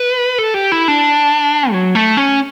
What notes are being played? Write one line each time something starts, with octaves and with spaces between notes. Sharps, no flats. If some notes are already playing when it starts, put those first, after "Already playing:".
Already playing: B4
A4
G4
E4
D4
F#3
A3
C#4